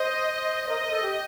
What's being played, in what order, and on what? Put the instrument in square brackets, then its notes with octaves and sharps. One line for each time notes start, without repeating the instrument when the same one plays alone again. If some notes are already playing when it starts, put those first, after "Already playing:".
Already playing: [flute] C5 [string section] D#5
[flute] A#4 [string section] D#5
[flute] C5
A#4
A4
G4